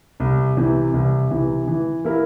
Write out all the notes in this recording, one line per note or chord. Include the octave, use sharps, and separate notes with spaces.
C2
C3 E3
C2
C3 E3
E3
A#3 E4 A#4